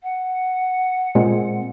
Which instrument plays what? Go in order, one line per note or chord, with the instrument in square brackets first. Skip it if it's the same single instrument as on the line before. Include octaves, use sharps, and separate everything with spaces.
[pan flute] F#5
[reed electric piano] A#2 G#3 C4